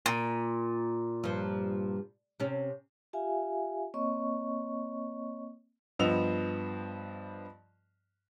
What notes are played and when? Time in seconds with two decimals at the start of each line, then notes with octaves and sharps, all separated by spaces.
0.06 A#2
1.24 G2 F3
2.40 C3 C#4
3.13 F4 G4 E5 F5 G#5
3.94 A#3 C4 C#5 D#5 C#6
5.99 G2 F3 B3 D#5 E6 F7